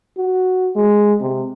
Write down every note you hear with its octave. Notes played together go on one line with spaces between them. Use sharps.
F#4
G#3
C3